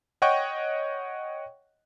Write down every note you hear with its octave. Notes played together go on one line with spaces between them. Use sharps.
C#5 D#5 F#5 G5 C#6